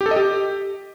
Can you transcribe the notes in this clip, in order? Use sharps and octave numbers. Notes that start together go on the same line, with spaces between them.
G4
A4
D#5
G4